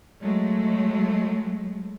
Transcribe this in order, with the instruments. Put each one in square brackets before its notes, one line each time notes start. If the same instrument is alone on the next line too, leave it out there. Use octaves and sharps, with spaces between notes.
[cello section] F#3 G#3 A3